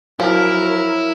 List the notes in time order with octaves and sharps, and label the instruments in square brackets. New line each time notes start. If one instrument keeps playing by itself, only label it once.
[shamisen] F3 [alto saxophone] F#3 [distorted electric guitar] E4 [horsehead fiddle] A#4